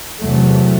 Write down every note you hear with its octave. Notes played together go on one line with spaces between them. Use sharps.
E2 C3 F#3 A3